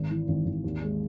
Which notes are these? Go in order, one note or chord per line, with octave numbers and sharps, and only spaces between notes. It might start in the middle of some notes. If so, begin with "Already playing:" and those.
Already playing: G#1
E3
G#1
G#1
D#2
G#3